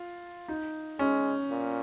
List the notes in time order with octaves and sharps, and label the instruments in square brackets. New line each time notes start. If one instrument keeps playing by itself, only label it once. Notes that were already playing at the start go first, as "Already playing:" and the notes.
Already playing: [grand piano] F4
D#4
[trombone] G#3 [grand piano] C#4
[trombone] A#2